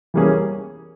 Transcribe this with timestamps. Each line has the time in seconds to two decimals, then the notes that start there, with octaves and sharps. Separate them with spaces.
0.14 E3 G3 A#3 C#4 G#4